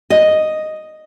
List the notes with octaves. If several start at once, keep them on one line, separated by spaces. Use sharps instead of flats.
D#5